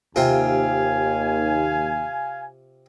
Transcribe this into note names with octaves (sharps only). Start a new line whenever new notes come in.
D#2 C3 F4 F5 G#5